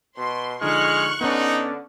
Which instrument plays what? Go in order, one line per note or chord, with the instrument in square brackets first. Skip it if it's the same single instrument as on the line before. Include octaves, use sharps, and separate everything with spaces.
[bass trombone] B2 [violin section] C6
[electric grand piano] D3 F3 D#4 [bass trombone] G#3 [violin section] C#6 F#6 [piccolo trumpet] F6
[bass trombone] D3 [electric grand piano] B3 C#4 [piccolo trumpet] D#4